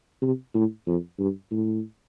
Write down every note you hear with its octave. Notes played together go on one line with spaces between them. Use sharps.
C3
A2
F2
G2
A2